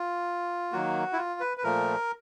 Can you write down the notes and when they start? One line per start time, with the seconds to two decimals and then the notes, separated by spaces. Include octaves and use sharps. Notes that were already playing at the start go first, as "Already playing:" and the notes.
Already playing: F4
0.72 D#3 F#3 A#3 F#4
1.13 E4
1.18 F4
1.40 B4
1.57 B4
1.64 A#2 F3 A3 A#4